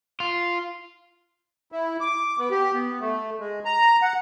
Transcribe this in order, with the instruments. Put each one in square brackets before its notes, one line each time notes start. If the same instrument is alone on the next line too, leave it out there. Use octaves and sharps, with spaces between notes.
[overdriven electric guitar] F4
[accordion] E4
D6
B3
G4
B3
A3
G#3
A#5
F#5